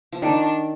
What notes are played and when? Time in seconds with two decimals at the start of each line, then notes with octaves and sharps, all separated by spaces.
0.12 F3
0.22 D#3 D4